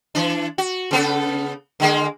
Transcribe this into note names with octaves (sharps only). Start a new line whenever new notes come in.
E3 D4
F#4
C#3 B3 A4
D3 G#3 A#3